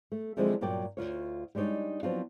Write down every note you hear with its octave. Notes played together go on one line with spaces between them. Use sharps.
A3
D3 F3 F#3 G#3 C4 E4
G2 A#2 F#3 D5 G5
D2 D#3 F4 C#5
G3 G#3 D4 D#4 C#5
F3 F#3 B3 C4 D4 F4